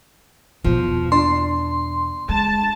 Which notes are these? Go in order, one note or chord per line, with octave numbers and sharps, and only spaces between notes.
E2 B2 F3
D4 C6
G#3 A5